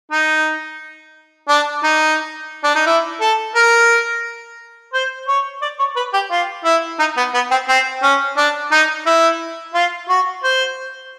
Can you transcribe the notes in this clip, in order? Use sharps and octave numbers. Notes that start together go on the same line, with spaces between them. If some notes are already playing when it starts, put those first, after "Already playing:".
D#4
D4
D#4
D4
D#4
E4
A4
A#4
C5
C#5
D5
C#5
B4
G4
F4
E4
D#4
B3
B3
C4
C4
C#4
D4
D#4
E4
F4
F#4
C5